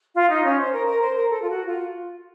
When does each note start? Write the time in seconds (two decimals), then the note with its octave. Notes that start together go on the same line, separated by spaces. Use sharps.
0.16 F4 F5
0.30 D#4 D#5
0.44 C#4 C#5
0.59 C5
0.73 A#4
0.87 A#4
1.02 C5
1.15 A#4
1.30 A4
1.43 F4
1.50 F#4
1.68 F4